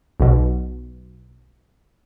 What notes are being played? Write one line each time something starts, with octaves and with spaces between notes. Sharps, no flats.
B1 B2